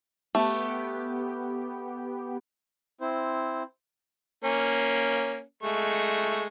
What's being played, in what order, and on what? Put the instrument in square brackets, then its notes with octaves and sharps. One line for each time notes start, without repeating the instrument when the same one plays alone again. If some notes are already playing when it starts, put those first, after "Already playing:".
[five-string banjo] A3 [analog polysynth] B3 G4
[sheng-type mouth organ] C4 E4 C5
[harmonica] A#3 C#4
G#3 A3 C#6